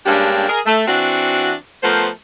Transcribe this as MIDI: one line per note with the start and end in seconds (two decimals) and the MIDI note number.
0.06 0.46 43
0.06 0.46 56
0.06 0.46 58
0.06 0.46 61
0.06 0.46 62
0.06 0.46 67
0.49 0.60 68
0.49 0.60 70
0.66 0.87 57
0.87 1.54 52
0.87 1.54 60
0.87 1.54 62
0.87 1.54 66
1.83 2.08 53
1.83 2.08 57
1.83 2.08 59
1.83 2.08 70
1.83 2.08 72